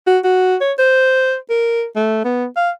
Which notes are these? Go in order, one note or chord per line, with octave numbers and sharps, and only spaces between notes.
F#4
F#4
C#5
C5
A#4
A3
B3
F5